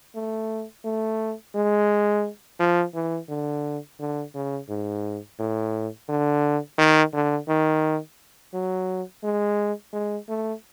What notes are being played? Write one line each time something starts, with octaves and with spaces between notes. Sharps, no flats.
A3
A3
G#3
F3
E3
D3
D3
C#3
G#2
A2
D3
D#3
D3
D#3
F#3
G#3
G#3
A3